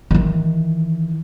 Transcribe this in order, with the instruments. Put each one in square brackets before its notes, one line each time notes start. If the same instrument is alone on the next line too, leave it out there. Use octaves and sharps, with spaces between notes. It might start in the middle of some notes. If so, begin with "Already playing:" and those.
[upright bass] D#3 E3